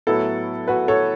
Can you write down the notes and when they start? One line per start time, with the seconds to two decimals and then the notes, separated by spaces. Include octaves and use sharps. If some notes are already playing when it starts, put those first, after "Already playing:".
0.07 A2 F#3 B3 E4 A4
0.67 F#4 B4
0.88 A4 C#5